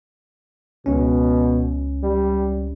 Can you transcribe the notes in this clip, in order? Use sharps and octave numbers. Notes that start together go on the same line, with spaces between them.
C#2 B2 C#4
G3